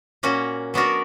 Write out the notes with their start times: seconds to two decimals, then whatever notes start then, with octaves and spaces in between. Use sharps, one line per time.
0.23 A#2 A#3 C#4 F#4
0.74 F#3 B3 D4 F#4 A#4